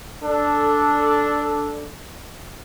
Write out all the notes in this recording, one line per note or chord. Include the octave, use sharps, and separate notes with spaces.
D4 A4